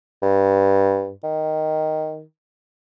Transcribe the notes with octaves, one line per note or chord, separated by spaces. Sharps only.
G2
D#3